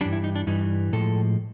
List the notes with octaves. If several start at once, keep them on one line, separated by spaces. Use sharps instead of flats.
G2 E3 G3 D4
E4
D#4
D4
G2 E3 G3 D#4
A2 F3 G#3 A4